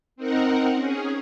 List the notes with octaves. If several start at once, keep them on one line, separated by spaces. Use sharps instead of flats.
C4 D#4 A#4 F#5
C#4 G#4